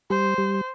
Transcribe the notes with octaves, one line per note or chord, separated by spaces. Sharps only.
G3 C5
G3